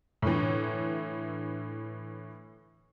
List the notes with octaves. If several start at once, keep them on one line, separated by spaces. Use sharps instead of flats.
A2 D3 E3